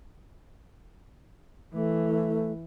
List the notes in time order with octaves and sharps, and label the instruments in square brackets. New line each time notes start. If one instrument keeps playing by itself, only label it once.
[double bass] E3 [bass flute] A3